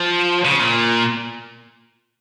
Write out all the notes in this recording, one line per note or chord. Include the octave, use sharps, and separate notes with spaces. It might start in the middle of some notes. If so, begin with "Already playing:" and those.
Already playing: F3
C#3
A#2